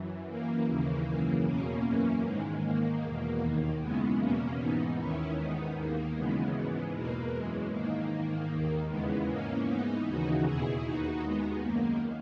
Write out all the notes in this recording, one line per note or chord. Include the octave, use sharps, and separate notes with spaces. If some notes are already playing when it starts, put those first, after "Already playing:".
Already playing: F#2 E3
F#2 E3 A#3
D#2 C#3 E3 A#3
F#2 C#3 E3
E2 B2 A#3 C#4
F#2 E3 A#3 C#4
G#2 D#3 G#3
G#2 D#3 A#3
E2 B2
D#2 D#3
F#2 C#3 E3 G#3 B3
E2 B2 A#3 C#4
G#2 E3 B3 D#4
D#2 D#3 C#4 E4
G#2 D#3 B3 D#4
D#2 D#3 A#3
F#2 C#3 E3 G#3 B3
G#2 E3 G#3 B3
E2 B2 A#3
F#2 E3 G#3
G#2 D#3 A#3
G#2 D#3
D#2 D#3
E2 C#3 E3 G#3 B3
G#2 E3 A#3 C#4
G#2 E3 B3 D#4
D#2 C#3 E3 D#4 F#4
E2 B2 E4 G#4
D#2 D#3 D#4 F#4
D#2 D#3 G#3 B3
F#2 D#3 A#3